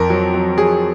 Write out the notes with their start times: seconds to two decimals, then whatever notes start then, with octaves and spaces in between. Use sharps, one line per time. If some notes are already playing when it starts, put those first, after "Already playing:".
Already playing: F2 A#4
0.10 F#3
0.34 F#3
0.58 F#3 G#4